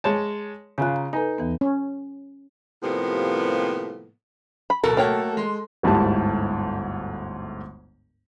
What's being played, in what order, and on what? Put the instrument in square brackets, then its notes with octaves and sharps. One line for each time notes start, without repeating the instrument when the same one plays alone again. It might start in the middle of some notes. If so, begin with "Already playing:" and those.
[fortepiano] G#3 C#5 A5
[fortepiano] C#3 F4 [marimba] G#5 A#5 F#6
[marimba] A#5
[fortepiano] D#4 [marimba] A4 B4 G#5
[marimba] D#2 E3 B3
[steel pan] C#4
[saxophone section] A2 C3 F3 G3 A#3 B3
[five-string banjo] B5
[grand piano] D1 B2 [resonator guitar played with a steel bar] A4 [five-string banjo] A#4
[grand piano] A3 F#4 F6 [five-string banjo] A#3 C#5 G5
[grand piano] G#3 C6
G1 D2 G#2 G3 E4 A5